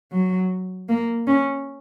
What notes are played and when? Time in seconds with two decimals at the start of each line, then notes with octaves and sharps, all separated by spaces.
0.12 F#3
0.89 A#3
1.27 C#4